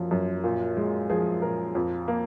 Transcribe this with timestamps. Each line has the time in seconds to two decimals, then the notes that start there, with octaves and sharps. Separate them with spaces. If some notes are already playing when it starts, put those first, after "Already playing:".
Already playing: F#2 F3 A#3
0.11 F#2
0.44 A#2
0.77 G#3
1.09 F3 G#4
1.42 A#2 A#4
1.75 F2
2.08 A#3